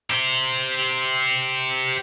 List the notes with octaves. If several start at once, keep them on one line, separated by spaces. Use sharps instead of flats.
G4 C5